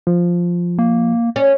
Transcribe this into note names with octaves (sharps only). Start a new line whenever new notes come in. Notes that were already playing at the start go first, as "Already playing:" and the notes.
F3
A#3
C#4